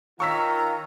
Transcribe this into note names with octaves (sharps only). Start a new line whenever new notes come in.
D#3 F4 C#5 F5 A#5 C#6 E6 B6